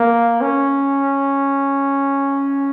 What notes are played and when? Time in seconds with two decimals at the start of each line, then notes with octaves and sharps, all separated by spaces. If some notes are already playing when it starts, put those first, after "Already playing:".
Already playing: A#3
0.41 C#4